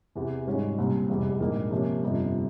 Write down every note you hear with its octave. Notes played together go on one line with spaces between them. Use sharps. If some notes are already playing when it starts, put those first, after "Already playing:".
E2 C3 E3
G#1 G#2 G3 C#4 F4
C2 A#2 G3 C4
F1 E2 C3 G3
A#1 G#2 E3 A#3
C3 F3 A#3 C#4
G1 F2 C3 F3